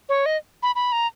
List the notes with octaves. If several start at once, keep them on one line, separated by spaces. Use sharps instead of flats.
C#5
D#5
B5
B5
A#5